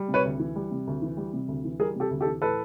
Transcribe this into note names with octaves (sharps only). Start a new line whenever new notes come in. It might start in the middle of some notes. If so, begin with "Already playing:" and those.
Already playing: G3
C3
B4 C#5
D2
E3
G3
C3
D2
E3
G3
C3
D2
E3
G3 G#4 A#4
C3 G4 A4
D2
G4 A4
E3
A2 A4 B4